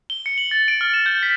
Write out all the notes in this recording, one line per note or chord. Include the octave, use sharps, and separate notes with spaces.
G7
C#7
F#7
A6
D7
F6
E7
G6
B6